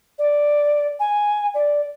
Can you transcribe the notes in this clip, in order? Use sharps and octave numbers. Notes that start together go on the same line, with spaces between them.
D5
G#5
D5